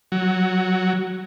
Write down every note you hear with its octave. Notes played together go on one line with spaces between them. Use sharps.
F#3